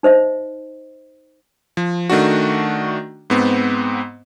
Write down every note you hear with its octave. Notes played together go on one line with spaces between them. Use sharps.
D#4 C5 D#5 E5
F3
D#3 A3 D4 F#4
G#2 B3 C4